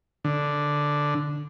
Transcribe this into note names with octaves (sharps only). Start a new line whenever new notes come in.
D3